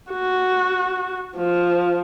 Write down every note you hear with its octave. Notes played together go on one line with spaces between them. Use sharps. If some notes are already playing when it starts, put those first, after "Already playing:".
F#4
F3